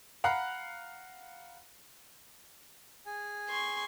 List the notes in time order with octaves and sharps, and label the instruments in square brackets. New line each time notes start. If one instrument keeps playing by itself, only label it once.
[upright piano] F5 F#5 A#5 B5 F#6
[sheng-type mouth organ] G#4 G#5
[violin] C6 C#6